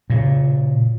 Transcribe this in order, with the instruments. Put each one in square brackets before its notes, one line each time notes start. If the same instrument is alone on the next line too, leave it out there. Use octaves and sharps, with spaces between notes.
[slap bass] A#2 C#3